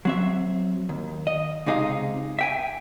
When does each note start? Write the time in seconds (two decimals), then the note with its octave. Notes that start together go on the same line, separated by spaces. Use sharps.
0.05 F#3 C4 E5
0.89 D#2
1.27 D#5
1.66 C#2 C3 D#4 G#4 D#5 F5
2.39 E5 G5 G#5